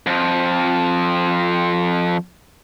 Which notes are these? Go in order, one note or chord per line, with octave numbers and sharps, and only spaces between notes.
F2 F3